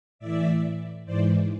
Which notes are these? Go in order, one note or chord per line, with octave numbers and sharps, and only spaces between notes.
A2 E3 D5 E5
G#2 E3 C5 D5